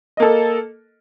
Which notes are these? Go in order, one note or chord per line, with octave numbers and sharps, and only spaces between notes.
A#3 A4 D#5